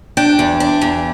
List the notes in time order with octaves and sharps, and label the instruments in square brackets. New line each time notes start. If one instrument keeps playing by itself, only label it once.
[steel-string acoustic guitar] D4 [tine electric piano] G5
[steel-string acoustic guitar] E2
D4
E2